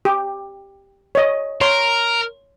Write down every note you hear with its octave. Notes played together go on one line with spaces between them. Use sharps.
G4
C#5 D#5
A#4 C#5 C6